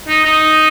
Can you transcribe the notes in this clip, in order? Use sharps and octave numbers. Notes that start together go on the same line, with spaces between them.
D#4
D#4